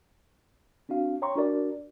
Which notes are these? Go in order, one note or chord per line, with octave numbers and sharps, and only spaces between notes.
C4 D4 F#4 F5
C#5 G5 A#5 C6 C#6
D4 F#4 A#4 D5